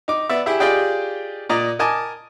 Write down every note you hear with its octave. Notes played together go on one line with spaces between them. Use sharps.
D#4 D6
B3 D5 E5
E4 G4 G#4 E5
F4 G4 G#4 D5 D#5 G5
A#2 D5 D#5 A#5
A#4 D#5 G#5 A5 D6